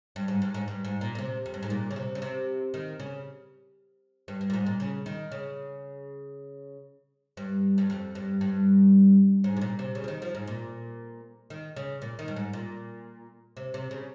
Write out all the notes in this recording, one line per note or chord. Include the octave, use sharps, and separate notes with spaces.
G2
G#2
G2
G#2
G2
G#2
A#2
A#2
C3
F2
G2
G#2
A#2
C#3
C3
C#3
C3
D#3
C#3
G2
G2
A#2
G#2
A#2
C#3
D#3
C#3
G2
G2
F2
G2
G2
G#2
C3
A#2
C3
C#3
F3
D#3
F3
G#2
A#2
D#3
C#3
A#2
D#3
G2
G#2
A#2
C3
C3
C#3